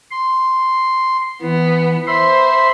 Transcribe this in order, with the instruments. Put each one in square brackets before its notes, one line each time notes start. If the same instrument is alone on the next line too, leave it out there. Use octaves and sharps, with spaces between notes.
[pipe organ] C6
[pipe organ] E3 [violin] B3
[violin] C5 [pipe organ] E5 B5 C6